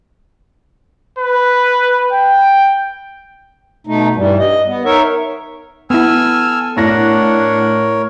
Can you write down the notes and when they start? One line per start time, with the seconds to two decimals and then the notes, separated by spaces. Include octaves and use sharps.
1.19 B4
2.13 G5
3.87 B2 A3 D#4
4.16 G2 E3 G3
4.39 D#5
4.67 B3
4.85 D#4 A#4 C#5 E5
5.90 B3 E4 A4 G#5 E6 F6
6.77 A2 D4 A#4 C#5 F#5 A#6